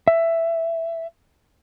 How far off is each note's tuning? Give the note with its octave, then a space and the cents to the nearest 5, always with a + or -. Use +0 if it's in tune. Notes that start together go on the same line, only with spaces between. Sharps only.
E5 +10